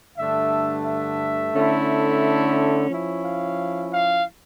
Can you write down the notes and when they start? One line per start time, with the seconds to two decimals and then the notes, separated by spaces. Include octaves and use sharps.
0.17 G2 D3 A3 D4 E5
0.85 E5
1.54 D3 A3 C#4 E4
2.90 F3 C#4 E4
3.24 F5
3.92 F5